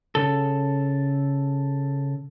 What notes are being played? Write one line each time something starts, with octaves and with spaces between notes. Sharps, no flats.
C#3 A4